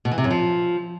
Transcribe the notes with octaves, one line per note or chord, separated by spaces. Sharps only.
B2
E3
C3
F#2
F3